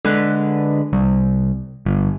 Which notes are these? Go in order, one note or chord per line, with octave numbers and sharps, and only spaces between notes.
D3 G#3 B4
C2
G1